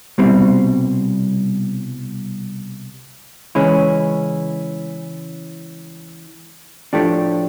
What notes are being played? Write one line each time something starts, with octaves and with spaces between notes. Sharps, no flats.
C2 B2 G3 C4
C#3 E3 G#3 C#4 E4
A2 F3 A3 D4 G4